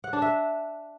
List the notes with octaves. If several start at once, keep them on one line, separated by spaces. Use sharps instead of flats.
F#5
D4
E5